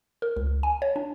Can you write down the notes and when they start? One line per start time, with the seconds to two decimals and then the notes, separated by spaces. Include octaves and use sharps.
0.22 A#4
0.37 C#2
0.63 G#5
0.82 C#5
0.96 D4